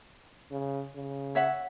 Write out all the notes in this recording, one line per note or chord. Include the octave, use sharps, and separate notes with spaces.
C#3
C#3
C#5 E5 F#5